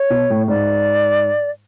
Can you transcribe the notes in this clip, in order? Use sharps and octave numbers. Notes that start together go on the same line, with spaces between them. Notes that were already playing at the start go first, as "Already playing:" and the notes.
Already playing: C#5
B2
A2
G#2 D5